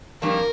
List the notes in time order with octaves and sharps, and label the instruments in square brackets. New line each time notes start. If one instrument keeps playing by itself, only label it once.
[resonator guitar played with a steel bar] F2 D#3 G3 A#3 D4 [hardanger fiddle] A#4